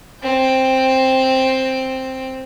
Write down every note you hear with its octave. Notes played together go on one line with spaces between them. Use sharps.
C4 G5